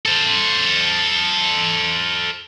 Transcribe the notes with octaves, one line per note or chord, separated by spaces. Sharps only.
A4 C5